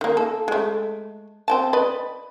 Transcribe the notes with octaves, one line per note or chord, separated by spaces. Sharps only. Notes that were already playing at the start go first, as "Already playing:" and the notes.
D#3 A#3
A4
G#3 A3
C4 G5 A5
B4 D5 D#5